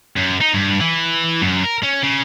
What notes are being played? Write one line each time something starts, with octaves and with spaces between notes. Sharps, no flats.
F#2
D#4
G2
E3
F#2
A#4
C#4
C#3